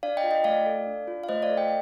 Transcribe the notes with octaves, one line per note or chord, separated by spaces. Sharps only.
D4 D5 F5
D#5 G5
F4
D#5 G5
A3 D5 F5
A4
D4
F4
F5
A3 C5 D#5
D5 F5
A4
D#5 G5